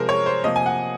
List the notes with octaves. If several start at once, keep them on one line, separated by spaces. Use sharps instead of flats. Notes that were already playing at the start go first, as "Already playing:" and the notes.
Already playing: C3 F3 G#3 A#4 C5
C#5
C5
C3 F3 A#3 D#5
G#5
F#5